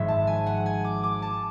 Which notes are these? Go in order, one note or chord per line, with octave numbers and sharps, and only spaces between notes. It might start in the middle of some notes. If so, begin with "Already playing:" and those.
Already playing: G#1 G#2 F3 G#3 E5
A5
G#5
F#5
G#5
D6
D6
A5